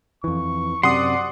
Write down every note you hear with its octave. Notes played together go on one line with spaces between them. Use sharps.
F2 E3 C#6
F#2 C3 D5 F#5 C6 D#6